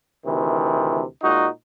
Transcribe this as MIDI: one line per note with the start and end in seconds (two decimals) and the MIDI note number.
0.25 1.03 38
0.25 1.03 48
0.25 1.03 51
0.25 1.03 52
1.22 1.46 46
1.22 1.46 56
1.22 1.46 63
1.22 1.46 66